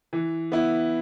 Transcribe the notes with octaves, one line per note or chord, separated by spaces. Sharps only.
E3
B3 E4